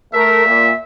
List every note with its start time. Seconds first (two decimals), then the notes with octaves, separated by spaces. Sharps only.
0.14 A3 A#4 E5
0.45 A#2